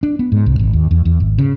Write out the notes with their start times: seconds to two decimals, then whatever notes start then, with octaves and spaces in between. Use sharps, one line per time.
0.03 D4
0.19 B3
0.32 G#2
0.46 C2
0.59 G#1
0.73 D#2
0.91 E2
1.05 E2
1.20 G#1
1.38 C#3